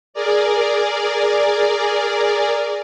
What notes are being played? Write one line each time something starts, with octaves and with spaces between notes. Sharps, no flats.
G#4 A#4 D5